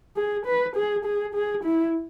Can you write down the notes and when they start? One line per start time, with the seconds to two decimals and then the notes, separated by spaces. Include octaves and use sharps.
0.17 G#4
0.46 B4
0.76 G#4
1.05 G#4
1.34 G#4
1.64 E4